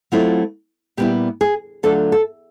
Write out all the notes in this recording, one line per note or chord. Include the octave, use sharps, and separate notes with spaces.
F#3 A3 C4 E4 F4
A#2 G3 B3 E4 G4
G#4
D3 F#3 A3 D4 F4 A4
A4